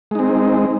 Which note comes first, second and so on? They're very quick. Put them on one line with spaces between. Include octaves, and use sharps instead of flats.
G#3 D#4 C4